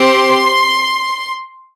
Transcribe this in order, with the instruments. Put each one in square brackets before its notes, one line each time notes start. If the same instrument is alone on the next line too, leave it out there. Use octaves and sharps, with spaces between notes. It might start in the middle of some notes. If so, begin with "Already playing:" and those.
Already playing: [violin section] C4 G4 C6